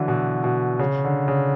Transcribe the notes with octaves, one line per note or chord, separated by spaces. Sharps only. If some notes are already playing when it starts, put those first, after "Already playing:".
Already playing: D3 E3 F#3
B2
B2
C#3
D3
C#3